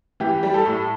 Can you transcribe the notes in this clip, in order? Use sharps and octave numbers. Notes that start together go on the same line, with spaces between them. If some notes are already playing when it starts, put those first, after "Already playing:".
E3 G4
G3
A4
A2